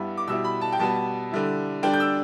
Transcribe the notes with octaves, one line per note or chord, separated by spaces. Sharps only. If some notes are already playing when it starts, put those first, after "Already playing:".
Already playing: G2 G3 B3 E4
D6
B2 G3 E4 E6
B5
A5
G5
B2 G3 B3 A5
D3 G3 E4
D3 G3 D4 G5
G6
E6